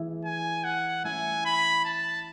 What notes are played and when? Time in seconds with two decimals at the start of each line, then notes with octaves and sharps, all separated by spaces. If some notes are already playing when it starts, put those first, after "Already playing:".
Already playing: E3 A3 E4 G#4
0.25 G#5
0.64 F#5
1.04 A3 C#4 E4 G#5
1.45 B5
1.85 A5